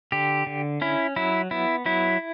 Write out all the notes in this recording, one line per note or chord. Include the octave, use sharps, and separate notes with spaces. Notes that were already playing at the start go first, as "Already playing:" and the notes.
D3 G4
D3
C#4 E4
F#3 E4
B3 E4
F#3 E4